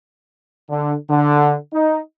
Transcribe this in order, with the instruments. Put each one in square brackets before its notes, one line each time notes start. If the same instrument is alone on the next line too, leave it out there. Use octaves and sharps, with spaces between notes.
[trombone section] D3
D3
D#4